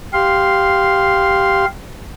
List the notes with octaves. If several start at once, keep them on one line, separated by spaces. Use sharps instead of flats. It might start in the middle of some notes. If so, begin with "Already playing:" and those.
G4 F5 C6